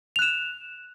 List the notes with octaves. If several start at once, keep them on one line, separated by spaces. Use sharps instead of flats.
F#6 E7 F7